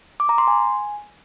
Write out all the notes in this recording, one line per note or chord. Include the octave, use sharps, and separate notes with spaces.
D6
A#5
C6
G#5